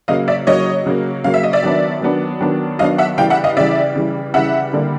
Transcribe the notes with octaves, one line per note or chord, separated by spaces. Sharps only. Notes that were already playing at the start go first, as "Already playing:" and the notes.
C#3 F#3 A#3 D#5 F5
D5 E5
C#3 F#3 A#3 C#5 D#5
C#3 F#3 A#3
C#3 F#3 A#3 F5
E5
D#5
D5 E5
D#3 F#3 B3 D4
D#3 F#3 B3 D4
D#3 F#3 B3 D4
D#3 F#3 B3 D4 D#5 F5
E5 F#5
C#3 E3 G3 F5 G5
E5 F#5
D#5 F5
C#3 E3 G3 D5 E5
C#3 E3 G3
C#3 E3 G3 E5 F#5
D3 G3 A#3